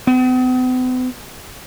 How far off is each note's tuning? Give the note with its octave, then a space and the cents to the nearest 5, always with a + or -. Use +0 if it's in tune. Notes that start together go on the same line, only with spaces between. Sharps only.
B3 +45